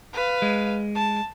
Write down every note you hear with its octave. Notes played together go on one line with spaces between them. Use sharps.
B4 F5
G#3
A5